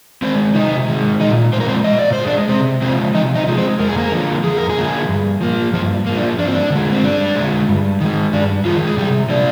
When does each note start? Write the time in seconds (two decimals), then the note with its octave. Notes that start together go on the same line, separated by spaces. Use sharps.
0.22 D#3 G#3 C4 C5
0.55 C3 D#4 D#5
0.88 D#3 G#3
1.20 A#2 D#4 D#5
1.53 F3 G#3 C5
1.60 A#4
1.68 C4 C5
1.84 A#2 D#5
1.99 D5
2.13 C5
2.18 F3 G#3
2.27 D4 D5
2.49 C3 C4 C5
2.82 F3 G#3 C4 C5
3.14 C3 D#4 D#5
3.35 D#4 D#5
3.47 F3 G#3
3.58 C4 C5
3.79 F2 A#4
3.88 G#4
3.97 A#3 A#4
4.11 D3 F3 A#3
4.44 F2 G#4
4.57 A#4
4.70 G#3 G#4
4.77 D3 F3 A#3
5.09 G2
5.41 F3 A#3
5.73 G2 F3 F4
6.06 F3 A#3
6.17 D4
6.38 G2 D4
6.46 C4
6.53 D4
6.70 D3
6.75 G#3
6.92 C4
7.03 G2 D4
7.35 D3 G#3
7.69 G2
8.01 D#3 G#3
8.33 G2 D4
8.65 D#3 F3 G#3 F4
8.87 G#4
8.97 C3 G3 G4
9.29 F3 A#3 D4 D5